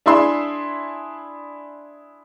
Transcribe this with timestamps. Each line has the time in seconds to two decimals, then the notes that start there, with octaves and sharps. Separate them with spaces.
0.06 D4 E4 G#4 E5 C6